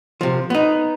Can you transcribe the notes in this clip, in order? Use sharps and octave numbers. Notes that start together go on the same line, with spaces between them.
C3 F3
B3 D#4